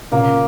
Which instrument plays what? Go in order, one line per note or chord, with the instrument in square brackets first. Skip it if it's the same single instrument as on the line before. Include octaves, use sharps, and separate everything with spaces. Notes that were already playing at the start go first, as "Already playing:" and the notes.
[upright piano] A#2 C#3 [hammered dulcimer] A#3